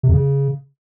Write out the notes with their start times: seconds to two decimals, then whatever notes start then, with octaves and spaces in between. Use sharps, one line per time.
0.03 C3
0.08 F2
0.14 C#3